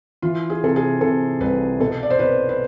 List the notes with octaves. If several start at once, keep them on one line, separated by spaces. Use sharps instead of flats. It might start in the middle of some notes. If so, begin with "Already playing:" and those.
E3 F4
G#4
C3 A4
G#4
C3 A4
C2 B4
B2 A4
D5
C5
B2 B4
B4